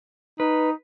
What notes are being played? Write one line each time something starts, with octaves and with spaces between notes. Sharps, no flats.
D#4 B4